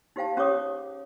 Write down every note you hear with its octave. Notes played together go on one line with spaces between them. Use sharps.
D#4 G4 C5 F5 G5 A5
C#4 G4 G#4 C#5 D6 D#6